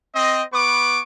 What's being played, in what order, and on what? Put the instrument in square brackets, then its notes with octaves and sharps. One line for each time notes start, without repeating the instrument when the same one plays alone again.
[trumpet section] C4 D#5
B3 B4 C#6 D6